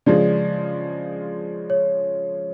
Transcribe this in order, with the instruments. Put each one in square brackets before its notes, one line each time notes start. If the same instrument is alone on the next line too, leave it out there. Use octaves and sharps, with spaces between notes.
[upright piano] C#3 F3 G#3 [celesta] D5
[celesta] C#5